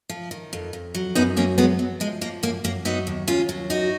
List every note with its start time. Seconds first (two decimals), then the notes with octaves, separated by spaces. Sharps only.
0.09 F3
0.31 D#3
0.53 F2
0.73 F2
0.95 F#3
1.15 F#2 B3 D#4
1.36 F#3 A#3 C#4
1.58 F#3 G#3 B3
1.79 F#3
2.00 F3 G#3
2.21 F3 A#3
2.43 F#2 A#3
2.64 F#2 A#3
2.85 F#3 B3 D#4
3.07 D#2
3.27 D#2 C#4 F4
3.49 F#3
3.70 F#2 D#4 F#4